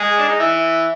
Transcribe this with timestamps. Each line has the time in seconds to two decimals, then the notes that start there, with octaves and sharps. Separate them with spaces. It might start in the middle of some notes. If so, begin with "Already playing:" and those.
Already playing: G#3 G#4
0.18 D4
0.28 D#4
0.39 E3 E4